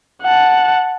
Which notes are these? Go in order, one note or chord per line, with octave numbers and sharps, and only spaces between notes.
F#5 A5